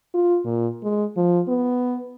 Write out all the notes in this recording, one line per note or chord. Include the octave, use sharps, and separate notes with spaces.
F4
A#2
G#3
F3
B3